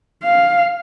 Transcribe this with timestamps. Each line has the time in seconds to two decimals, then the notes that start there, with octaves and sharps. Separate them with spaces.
0.23 F5